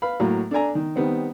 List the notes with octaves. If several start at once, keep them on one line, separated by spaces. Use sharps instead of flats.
B4 F5 B5
A2 F#3 A#3
D4 A4 D5 G#5 A#5
D#3
D#3 G3 B3 C4